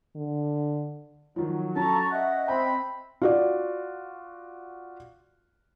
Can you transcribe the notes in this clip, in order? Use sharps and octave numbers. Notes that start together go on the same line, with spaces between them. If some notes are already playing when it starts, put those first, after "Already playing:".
D3
D#3 F3 F#3
C#4 A4 A5 A#5 C#6
D#5 E5 F#5
C4 G5 B5
F4 F#4 D5